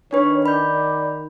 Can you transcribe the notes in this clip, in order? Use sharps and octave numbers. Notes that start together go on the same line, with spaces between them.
D#3 D4 B4 C#5
D5 B5 G6